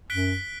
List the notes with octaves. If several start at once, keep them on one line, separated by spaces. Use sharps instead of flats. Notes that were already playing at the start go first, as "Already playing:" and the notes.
F#2 F#6 B6 D7 G7